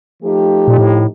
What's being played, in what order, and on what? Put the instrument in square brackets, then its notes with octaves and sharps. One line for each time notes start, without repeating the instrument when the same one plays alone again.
[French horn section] F3 A3 D#4 G4
[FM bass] A#2
A2